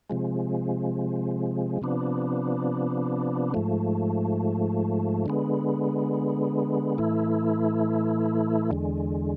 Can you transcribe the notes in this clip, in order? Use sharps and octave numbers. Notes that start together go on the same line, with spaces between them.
C3 F3 G#3
C3 F3 B3 D4
G#2 F3 A3
D3 G#3 B3
A2 E3 A3 E4
E2 D3 G#3